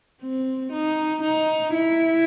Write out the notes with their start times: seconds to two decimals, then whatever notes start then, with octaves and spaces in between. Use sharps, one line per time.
0.23 C4
0.73 D#4
1.23 D#4
1.74 E4